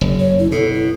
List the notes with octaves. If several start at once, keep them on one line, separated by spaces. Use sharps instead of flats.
F#1
C#5
E4
B2 A4
E4